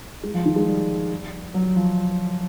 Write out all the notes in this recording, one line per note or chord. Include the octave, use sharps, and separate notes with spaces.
G#3
F3
D#3
G#3
G3
F#3
F3